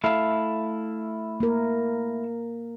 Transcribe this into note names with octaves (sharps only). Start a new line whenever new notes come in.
A3 E4 F5
A#3 A#4